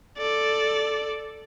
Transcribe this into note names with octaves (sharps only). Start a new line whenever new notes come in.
A4 D5